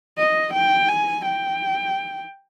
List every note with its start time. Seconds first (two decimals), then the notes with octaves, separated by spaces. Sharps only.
0.18 D#5
0.54 G5
0.89 G#5
1.25 G5